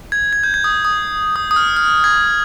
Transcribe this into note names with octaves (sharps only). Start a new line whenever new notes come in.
G#6
G#6
G6
G#6
D#6
D#6
D#6
D#6
F6
F6
G#6